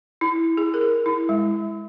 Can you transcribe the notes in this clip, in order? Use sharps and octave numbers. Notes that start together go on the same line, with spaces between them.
E4
G#4
A#4
G#4
E4
G#3